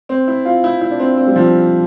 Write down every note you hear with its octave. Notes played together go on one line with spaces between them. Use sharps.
C4
E4
F4
E4
E4
D4
C4
C4
G3
F3